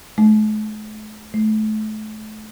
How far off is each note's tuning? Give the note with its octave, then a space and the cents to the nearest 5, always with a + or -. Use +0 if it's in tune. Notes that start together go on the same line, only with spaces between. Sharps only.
A3 -45
A3 -30